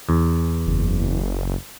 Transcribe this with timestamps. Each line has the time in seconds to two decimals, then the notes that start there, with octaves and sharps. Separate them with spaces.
0.09 E2
0.66 F#1